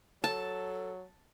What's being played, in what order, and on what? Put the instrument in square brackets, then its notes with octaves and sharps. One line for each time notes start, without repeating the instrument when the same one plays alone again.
[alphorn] F#3 [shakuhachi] A4 [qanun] A5